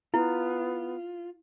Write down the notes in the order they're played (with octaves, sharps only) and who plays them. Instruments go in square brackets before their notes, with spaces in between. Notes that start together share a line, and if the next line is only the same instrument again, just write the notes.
[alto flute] B3 [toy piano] E4 [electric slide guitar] F4